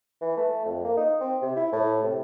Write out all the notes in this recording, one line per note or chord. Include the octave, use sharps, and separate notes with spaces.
E3
A3
F2
A#3
D#4
C4
C3
E4
A2
C3